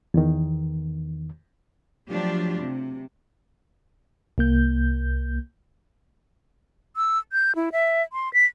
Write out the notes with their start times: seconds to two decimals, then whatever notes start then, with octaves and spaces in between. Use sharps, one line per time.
0.14 E2 D#3
2.08 F3 F#3 A3 D4 F4 G4
2.61 C3
4.38 C2 A#3 G6
6.96 E6
7.32 G6
7.55 E4
7.72 E5
8.13 C6
8.33 B6